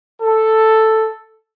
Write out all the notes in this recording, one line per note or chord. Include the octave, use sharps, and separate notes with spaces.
A4